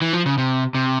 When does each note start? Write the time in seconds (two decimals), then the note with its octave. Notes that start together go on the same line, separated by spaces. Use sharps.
0.02 E3
0.13 F3
0.26 C#3
0.38 C3
0.75 C3